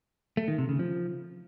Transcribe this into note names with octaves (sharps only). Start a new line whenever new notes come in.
A3
D#3
C3
C#3
F3